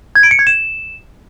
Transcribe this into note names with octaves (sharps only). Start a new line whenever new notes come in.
G#6
D7
C#7
G#6
E7